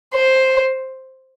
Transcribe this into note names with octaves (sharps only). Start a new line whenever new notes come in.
C5